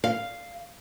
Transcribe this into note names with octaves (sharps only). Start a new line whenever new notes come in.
F5